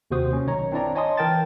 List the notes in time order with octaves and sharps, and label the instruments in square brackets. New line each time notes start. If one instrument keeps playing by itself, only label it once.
[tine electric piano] D#2 C3 F#4 C5 D#6
C#4
B1 D#3 C#5 A#5
C4 D4 E4 D5 A#5
C#5 D#5 G#5 A5 C6 D#6
E3 A#4 G5 A5 A6